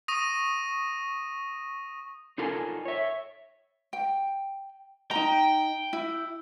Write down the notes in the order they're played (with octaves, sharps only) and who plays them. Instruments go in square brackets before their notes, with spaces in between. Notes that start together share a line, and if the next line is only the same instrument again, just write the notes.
[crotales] C#6 D#6 A#6 D#7
[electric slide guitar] D#4 F4 A4 A#4 F#5 G#5
C#5 E5
[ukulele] G5
[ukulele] D#4 A#5 [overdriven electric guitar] G5
[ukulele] E4